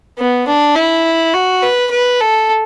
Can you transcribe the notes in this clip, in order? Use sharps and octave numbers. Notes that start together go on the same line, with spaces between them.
B3
D4
E4
F#4
B4
B4
A4